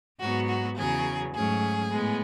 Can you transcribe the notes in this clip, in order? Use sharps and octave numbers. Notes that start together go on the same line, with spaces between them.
G#2 F#3 B3 F#4
F#4
E2 C#3 F#3 G#4
G#2 F#3 A3 C#4 G#4
A2 G#3 B3